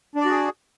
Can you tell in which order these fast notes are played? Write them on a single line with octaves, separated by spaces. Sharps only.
D4 D5 F#4 G#4